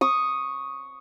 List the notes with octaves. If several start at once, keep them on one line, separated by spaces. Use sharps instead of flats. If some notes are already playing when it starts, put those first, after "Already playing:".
C#6 D#6